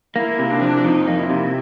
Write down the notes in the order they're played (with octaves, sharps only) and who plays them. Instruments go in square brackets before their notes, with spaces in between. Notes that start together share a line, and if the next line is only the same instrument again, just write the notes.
[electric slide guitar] A#3 [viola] E4
[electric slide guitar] C3
[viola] D4
[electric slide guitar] F3
[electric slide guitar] F2 [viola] D#4
[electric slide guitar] A#3
[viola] E4
[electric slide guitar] C3